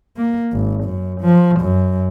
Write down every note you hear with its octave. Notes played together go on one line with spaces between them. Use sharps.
A#3
G#1
F#2
F3
F#2